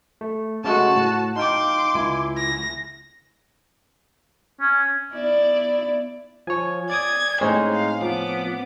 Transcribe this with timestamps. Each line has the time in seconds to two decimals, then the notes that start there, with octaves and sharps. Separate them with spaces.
0.21 A3
0.64 C#3 G#3 A3 F#4 A5
0.96 A2
1.36 D#4 F5 G5 C6 D6
1.95 C#2 E4 G#5
2.36 A#6
4.61 C#4
5.14 B3 E4 D5
6.47 F3 C#5 G#5
6.90 D5 D6 D#6 G#6
7.41 A2 G#3 C4 C#4 D#4 C5
7.70 F5
8.02 F3 B3 D6